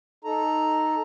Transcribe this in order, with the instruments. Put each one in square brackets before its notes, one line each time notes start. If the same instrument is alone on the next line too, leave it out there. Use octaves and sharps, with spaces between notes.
[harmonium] D#4 A4 A#5